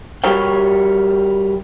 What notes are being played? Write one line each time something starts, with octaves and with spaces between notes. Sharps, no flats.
G3 F#4 G4 A#4 C#5 G5